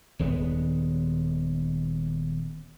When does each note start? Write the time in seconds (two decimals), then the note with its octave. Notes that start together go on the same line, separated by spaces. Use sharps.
0.19 D#1 D#2 G#3 B3